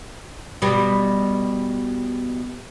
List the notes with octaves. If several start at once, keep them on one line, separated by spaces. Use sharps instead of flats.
B2 G3